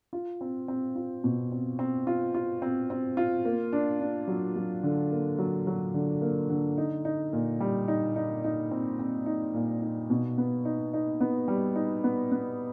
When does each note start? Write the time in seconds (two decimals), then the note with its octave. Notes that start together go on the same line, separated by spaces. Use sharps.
0.13 F4
0.41 C4
0.68 C4
0.96 F4
1.24 B2
1.52 C4
1.79 C4
2.07 F4
2.34 F4
2.62 C4
2.90 C4
3.17 F4
3.45 A#3
3.73 D4
4.00 D4
4.28 F#3
4.56 F#3
4.83 D3
5.12 A#3
5.38 F#3
5.67 F#3
5.94 D3
6.22 A#3
6.50 D3
6.78 D#4
7.05 D#4
7.33 A#2
7.60 G3
7.88 D#4
8.16 D#4
8.44 D#4
8.71 C4
8.99 C4
9.26 D#4
9.54 A#2
9.82 D#4
10.10 B2
10.38 B3
10.65 D#4
10.93 D#4
11.20 B3
11.48 G3
11.75 D#4
12.04 B3
12.32 B3